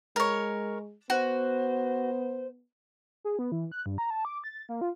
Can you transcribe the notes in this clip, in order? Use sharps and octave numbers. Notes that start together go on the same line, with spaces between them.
G#3 A#4 C#5
B3 F#4 C5
G#4
B3
E3
F#6
G2
A#5
A5
D6
A6
A#3
F4